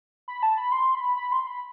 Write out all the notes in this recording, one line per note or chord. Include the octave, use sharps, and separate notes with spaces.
B5
A5
B5
C6
B5
B5
C6
B5